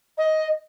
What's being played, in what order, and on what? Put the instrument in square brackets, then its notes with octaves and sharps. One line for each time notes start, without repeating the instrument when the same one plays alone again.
[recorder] D#5